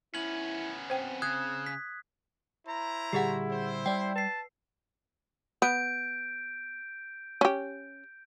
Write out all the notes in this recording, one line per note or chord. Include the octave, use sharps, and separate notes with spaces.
B3 C#4 E4 F#7
C4 C5 G5
C#3 D#6 F#6 G#6
B6
E4 C5 A#5
A#2 D3 G3 G4 G#4 F#5
C4 C5
G3 D5 G5
B4 A5 C7
B3 G6 D7
C#4 G4